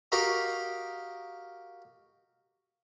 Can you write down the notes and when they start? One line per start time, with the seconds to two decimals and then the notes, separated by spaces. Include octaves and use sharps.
0.12 F#4 G4 A#4 D#5 F5